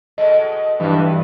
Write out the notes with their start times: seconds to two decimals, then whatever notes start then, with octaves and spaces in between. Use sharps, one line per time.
0.18 B2 G#3 A3 D#5
0.80 G2 E3 B3